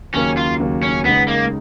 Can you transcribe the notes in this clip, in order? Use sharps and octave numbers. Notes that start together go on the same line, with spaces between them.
D#2 C#3 F#3 A#3 C#4
F4
D#2 C#3 F#3 A#3
C#4
C#2 C#3 G#3 B3 D#4
A#3